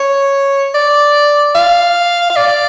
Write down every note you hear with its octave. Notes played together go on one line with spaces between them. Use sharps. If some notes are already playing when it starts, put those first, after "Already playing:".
Already playing: C#5
D5
F5
F5
D5